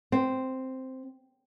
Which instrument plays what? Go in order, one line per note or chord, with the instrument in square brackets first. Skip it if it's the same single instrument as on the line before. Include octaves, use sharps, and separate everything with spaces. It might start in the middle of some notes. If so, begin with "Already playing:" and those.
[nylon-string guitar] C4